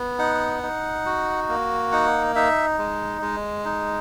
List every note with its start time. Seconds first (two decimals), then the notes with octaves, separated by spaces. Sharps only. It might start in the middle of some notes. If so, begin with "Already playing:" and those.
Already playing: B3
0.19 D#4 F#5
0.63 D#4
1.06 F#4
1.49 A#3
1.92 D#4 F#5
2.35 D#4 E5
2.79 G#3
3.22 G#3
3.65 D#4